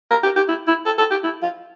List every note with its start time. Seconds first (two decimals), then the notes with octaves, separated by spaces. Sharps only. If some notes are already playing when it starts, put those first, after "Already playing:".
0.11 A#4
0.23 G4
0.36 G4
0.48 E4
0.67 E4
0.86 A4
0.98 A4
1.11 G4
1.23 E4
1.42 F4